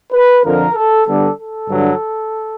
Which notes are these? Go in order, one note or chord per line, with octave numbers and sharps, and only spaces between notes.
B4
F2 D3 F3 A#4
A4
D3 G3 B3 D4 A4
A4
G2 D3 F#3